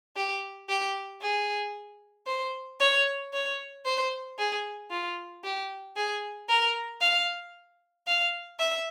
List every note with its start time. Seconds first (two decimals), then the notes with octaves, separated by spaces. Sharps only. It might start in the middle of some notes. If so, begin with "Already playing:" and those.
0.16 G4
0.69 G4
1.22 G#4
2.27 C5
2.80 C#5
3.33 C#5
3.85 C5
4.39 G#4
4.91 F4
5.44 G4
5.96 G#4
6.49 A#4
7.01 F5
8.07 F5
8.60 E5